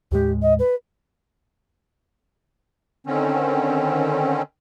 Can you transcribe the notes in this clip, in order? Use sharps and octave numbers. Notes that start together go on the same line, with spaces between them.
D#2 A2 G#3 G4
D#5
B4
D3 D#3 C4 C#4